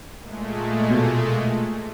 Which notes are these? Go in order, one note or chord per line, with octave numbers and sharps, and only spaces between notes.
A#2 G#3 A3
B2